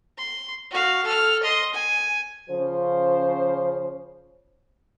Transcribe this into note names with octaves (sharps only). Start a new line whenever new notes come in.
C6
F#4 F5
A4 F6
D#5 C6
G#5
C#3 F3 C#4 C5